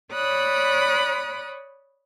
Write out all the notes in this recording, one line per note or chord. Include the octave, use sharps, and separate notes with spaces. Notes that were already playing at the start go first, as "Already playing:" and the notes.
C#5 D5 B5 D#6 F#6